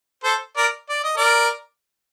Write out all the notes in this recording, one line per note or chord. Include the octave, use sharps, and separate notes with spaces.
A4 C5
A#4 D5
D5
D#5
A#4 D5